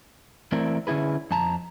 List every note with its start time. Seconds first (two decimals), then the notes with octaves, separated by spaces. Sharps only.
0.52 E3 A3 C4 E4 A#4 D5
0.87 D3 C#4 E4 G#4 B4
1.31 F2 A5 A#5